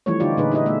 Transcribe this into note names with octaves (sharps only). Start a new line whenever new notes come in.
E3 F3 G3 A3 C4 C#5
D3 D#4 F4 G4 D5
A#2 D3 D#4 G#4 B4
D#4 E4 G4 B4 D#5
A3 B3 E5